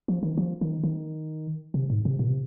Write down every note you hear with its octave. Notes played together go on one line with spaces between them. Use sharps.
F3
D#3
F3
D#3
D#3
C3
G#2
C3
A#2
C3